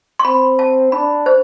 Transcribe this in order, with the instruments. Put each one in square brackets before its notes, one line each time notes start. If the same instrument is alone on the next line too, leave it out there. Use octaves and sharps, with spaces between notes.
[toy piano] C6
[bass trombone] C4 [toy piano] B5
[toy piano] A5
[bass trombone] D4 [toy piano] B5
[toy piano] C5